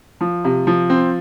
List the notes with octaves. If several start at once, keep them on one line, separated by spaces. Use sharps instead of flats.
F3
C3
F3
C4